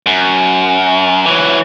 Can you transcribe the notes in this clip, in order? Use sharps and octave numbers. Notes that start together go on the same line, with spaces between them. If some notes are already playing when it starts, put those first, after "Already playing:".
F#2
E3 F#3